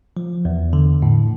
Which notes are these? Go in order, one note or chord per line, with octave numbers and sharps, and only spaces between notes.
F3
E2
D3
A2